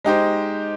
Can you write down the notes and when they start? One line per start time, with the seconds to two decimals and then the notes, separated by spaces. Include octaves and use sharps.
0.04 G#3 D#4 G4 C5